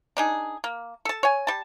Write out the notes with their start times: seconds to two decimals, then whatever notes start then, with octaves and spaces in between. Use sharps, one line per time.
0.17 D4 D#4 G#4
0.64 A#3
1.05 A4 A5
1.23 C#5 G#5
1.47 G3 A5